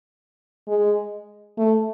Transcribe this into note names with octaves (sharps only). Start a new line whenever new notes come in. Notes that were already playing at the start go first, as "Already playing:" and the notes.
G#3
A3